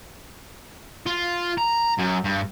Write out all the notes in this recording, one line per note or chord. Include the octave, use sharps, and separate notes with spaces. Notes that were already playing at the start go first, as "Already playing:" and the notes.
F4
A#5
F#2
G2